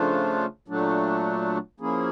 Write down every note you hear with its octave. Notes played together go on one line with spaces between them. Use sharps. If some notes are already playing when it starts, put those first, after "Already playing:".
Already playing: C#3 F3 A3 D4 F4
A#2 F#3 A3 D4
F3 A#3 C#4 E4 G#4